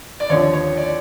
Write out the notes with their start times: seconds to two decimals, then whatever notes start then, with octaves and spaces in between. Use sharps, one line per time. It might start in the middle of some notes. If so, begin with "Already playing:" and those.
0.20 D5
0.29 D#2 D3 F3 C#5
0.53 C#5
0.77 D5